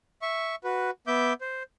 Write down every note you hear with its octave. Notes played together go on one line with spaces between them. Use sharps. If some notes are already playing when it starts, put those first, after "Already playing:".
E5 C#6
F#4 B4
B3 E5 D6 G6
C5